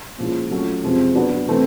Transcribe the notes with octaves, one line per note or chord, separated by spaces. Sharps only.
A#2 F3 G#3 C#4 E4
F#3 A3 C#4 F4
F2 C3 F3 G#3 C4
F#3 B3 D4 F#4
C3 E3 A3 C4